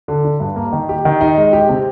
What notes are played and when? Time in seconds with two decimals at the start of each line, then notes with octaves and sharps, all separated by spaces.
0.08 D3
0.25 D4
0.40 G2
0.56 A#3
0.73 D#3
0.89 G4
1.05 D#3
1.21 D#4
1.37 G#3
1.53 G4
1.69 C3